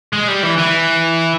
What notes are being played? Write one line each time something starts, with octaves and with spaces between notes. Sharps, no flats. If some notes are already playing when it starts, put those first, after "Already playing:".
G#3
G3
E3
E3